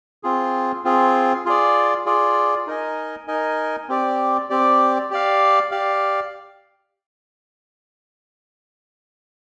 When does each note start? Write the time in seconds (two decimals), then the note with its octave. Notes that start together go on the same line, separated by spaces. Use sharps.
0.23 C4 F4 G#4
0.85 C4 F4 G#4
1.46 F4 G#4 D5
2.06 F4 G#4 D5
2.67 D#4 A#4 D#5 G#5
3.28 D#4 A#4 D#5 G#5
3.89 C4 G4 D5
4.50 C4 G4 D5
5.10 G4 D5 F5
5.71 G4 D5 F5